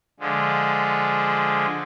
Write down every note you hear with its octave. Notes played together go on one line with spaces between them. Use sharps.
D3 F3 G#3